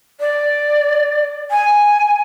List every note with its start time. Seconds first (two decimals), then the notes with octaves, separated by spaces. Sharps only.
0.20 D5
1.50 G#5